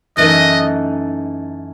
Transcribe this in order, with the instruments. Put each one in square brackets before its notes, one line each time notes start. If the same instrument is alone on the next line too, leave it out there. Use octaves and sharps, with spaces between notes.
[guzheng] F#2 E3 A3 D#4 [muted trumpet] D#5